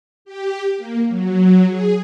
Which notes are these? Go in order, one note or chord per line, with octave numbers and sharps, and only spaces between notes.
G4
A#3
F#3
G#4